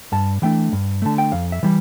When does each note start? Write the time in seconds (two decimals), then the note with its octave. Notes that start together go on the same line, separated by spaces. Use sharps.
0.12 G2 A5
0.42 E3 A3 D4 G5
0.73 G2
1.02 D3 A3 A5
1.18 G5
1.32 F2 F5
1.52 E5
1.63 E3 G3